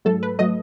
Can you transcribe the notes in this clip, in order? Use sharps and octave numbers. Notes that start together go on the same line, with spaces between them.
G#2 F#3 A3 A4
B4
F#3 A3 D#5